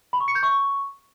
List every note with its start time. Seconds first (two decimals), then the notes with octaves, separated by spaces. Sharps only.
0.13 B5
0.20 C#6
0.28 C#7
0.35 G6
0.43 C#6